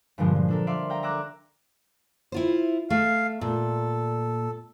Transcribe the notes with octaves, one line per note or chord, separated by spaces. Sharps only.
G2 A#2 D3 F3 G#3
F3
D4 A4 A#4
D5 E5 F5 C6
F5 G5 A#5
A#5 D6 E6 F#6 G#6
E4 F4 C5
A3 F5
A#2 A4